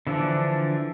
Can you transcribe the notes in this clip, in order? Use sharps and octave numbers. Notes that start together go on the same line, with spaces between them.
D3 E3 F3 D4